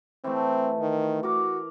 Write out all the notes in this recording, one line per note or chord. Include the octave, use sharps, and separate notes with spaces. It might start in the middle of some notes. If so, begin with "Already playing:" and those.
E3 A3 C4
D#3
F#4 A#4 D6